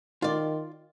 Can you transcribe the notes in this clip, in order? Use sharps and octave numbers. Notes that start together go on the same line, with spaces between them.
D#3 F4 D5